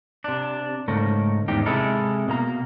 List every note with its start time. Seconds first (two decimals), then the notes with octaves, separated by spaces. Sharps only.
0.24 C3 D4
0.88 G#2 C#3 A3 A#4
1.48 E2 G#2 D#3 D#4 G4
1.66 C3 G#3 E4 A4 A#4
2.28 B2 A#3 A#5